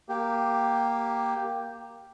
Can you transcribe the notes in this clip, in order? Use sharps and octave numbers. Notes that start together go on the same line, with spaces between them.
A#3 G4